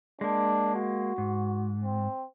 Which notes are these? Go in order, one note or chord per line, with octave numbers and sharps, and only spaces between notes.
G#3 A#3 D4
F#4
G#2
C4